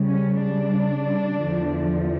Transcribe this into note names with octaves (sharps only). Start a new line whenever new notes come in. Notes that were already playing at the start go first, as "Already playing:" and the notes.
Already playing: C#3 G3
C#4
D4
E2 D3 F3